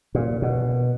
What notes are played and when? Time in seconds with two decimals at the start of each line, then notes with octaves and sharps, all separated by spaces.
0.15 A#2
0.42 B2